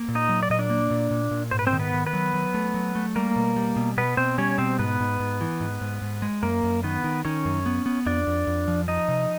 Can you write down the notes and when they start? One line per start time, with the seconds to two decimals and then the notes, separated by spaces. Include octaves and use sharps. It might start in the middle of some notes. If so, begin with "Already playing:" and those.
Already playing: A#3
0.08 A#2
0.15 D#4 D#5
0.29 F#3
0.43 D5
0.50 A#2 D#5
0.59 D4 D5
0.70 A#3
0.91 A#2
1.11 A#2
1.31 A#2
1.51 G#2 C5
1.59 B4
1.67 C4 C5
1.72 D#3
1.79 B3 B4
1.93 D#3
2.07 B3 B4
2.13 F#3
2.34 F#3
2.54 A3
2.74 F#3
2.95 A3
3.16 G3 A#3 A#4
3.36 B2
3.56 G3
3.76 B2
3.97 B2 B3 B4
4.17 B2 C4 C5
4.38 G3 C#4 C#5
4.58 B2 C4 C5
4.79 G#2 B3 B4
5.00 G#2
5.20 G#2
5.41 E3
5.61 G#2
5.81 G#2
6.02 G#2
6.22 G#3
6.43 F#2 A#3 A#4
6.63 F#2
6.83 D#3 B3 B4
7.04 D#3
7.25 D#3 C#4 C#5
7.45 F#2
7.66 B3
7.86 B3
8.06 F2 D4 D5
8.27 F2
8.47 F2
8.68 F3
8.88 F3 D#4 D#5
9.08 C3